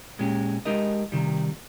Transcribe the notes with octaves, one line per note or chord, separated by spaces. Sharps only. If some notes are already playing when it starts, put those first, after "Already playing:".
A#2 G#3 C#4 G4
G#3 D#4 G4 A#4 D#5
C3 D#3 G3